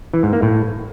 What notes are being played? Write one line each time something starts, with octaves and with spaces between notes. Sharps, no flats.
E3
G#2
A#3
A2